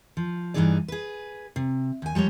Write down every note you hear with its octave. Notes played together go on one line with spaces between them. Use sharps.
F3
G2 D#3 E3 D#4 G#4 D5
G#4 B4
C3
D#2 G#5
F3 G3 G#3 C#5